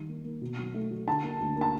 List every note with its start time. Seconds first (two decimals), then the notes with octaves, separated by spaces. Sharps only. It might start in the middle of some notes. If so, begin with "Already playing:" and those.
Already playing: D#3 G3
0.09 A#3
0.24 A#3
0.41 B2
0.58 F#3
0.74 A3
0.91 F#3
1.07 D3 A5
1.24 A#3
1.40 D2
1.56 A#3 A5